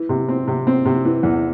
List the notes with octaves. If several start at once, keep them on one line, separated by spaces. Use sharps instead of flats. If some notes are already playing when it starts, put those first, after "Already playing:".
Already playing: E3
C3
C4
C3
C4
C3
E3
E2